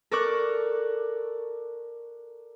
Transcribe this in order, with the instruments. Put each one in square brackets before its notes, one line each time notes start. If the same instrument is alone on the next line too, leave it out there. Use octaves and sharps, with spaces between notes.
[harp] A4 A#4 D5 C#6 D6 F#6